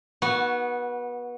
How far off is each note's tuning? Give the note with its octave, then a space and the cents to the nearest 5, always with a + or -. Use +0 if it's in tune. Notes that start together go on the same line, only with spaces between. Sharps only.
B3 -25 F#4 +0